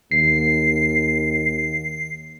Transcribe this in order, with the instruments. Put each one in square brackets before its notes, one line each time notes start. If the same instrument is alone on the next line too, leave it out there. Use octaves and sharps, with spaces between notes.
[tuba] D#2 [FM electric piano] C7